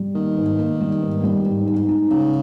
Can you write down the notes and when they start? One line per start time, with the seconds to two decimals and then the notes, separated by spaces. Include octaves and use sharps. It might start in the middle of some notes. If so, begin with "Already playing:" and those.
Already playing: G3
0.15 D#3 A#3
0.37 G#2
0.59 A#3
0.81 G3
1.02 G#2
1.24 G3
1.46 G#2
1.67 G#2
1.89 D#4
2.10 C#3 D#4